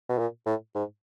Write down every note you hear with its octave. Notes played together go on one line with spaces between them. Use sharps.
B2
A#2
A2
G#2